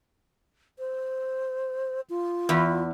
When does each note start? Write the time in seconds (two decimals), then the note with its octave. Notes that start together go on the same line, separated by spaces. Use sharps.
0.79 C5
2.10 F4
2.49 E2